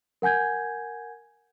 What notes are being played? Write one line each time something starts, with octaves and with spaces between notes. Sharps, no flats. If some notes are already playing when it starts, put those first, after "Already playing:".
A#4 F#5 G#5 G6 G#6